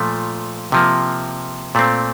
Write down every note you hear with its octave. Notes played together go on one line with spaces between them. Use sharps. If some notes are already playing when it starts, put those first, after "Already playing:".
Already playing: A#2 F3 A3
C3 F3 A#3
A#2 A3 C4